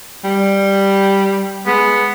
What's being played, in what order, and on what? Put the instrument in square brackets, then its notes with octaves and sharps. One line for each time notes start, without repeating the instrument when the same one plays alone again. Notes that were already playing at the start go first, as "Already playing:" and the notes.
[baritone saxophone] G3
[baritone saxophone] G#3 [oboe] B3